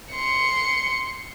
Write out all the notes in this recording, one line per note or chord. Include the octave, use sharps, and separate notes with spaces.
C6 C#7